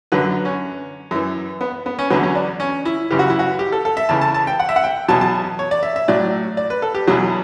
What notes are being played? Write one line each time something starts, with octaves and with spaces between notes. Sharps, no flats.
F#2 D3 F#3 B4
C#4
F#2 E3
B3
B3
C#4
E2 D3 F#3 B3
C#4
D4
C#4
E4
F#2 C#3 E3 G4
F#4
E4
F#4
G4
A4
A4
E5
E2 C#3 E3 A5
A5
A5
G5
F#5
E5
F#5
G5
E2 B2 F#3 A5
A5
C#5
D5
E5
E5
A2 F#3 D5
D5
B4
A4
G4
E2 B2 F#3 E4